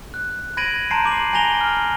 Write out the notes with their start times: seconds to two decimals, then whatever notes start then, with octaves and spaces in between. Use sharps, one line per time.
0.14 F#6
0.57 B5 G#6 A#6 D7 D#7 F#7
0.91 A5 A#5 C6 G6 C7 D7
1.05 D6 F#7
1.33 G#5 A#5 A#6 F7 G7
1.61 F6